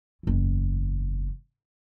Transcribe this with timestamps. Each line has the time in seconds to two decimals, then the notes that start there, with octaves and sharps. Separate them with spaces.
0.23 F#1 E2